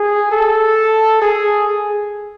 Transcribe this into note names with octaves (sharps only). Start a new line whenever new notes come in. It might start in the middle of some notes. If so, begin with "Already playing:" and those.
Already playing: G#4
A4
G#4